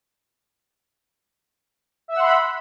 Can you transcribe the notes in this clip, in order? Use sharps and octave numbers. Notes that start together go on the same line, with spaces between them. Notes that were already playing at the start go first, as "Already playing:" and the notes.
E5 F#5 B5 C6 E6